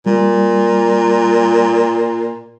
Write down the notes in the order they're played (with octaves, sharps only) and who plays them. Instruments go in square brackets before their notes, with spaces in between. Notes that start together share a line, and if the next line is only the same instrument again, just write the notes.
[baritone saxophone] A#2 [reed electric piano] G3